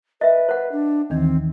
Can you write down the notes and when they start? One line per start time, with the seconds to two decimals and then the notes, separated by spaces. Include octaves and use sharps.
0.21 B4 D#5 E5
0.49 C5 F#5
0.72 D4
1.10 D#2 D#3 E3 C4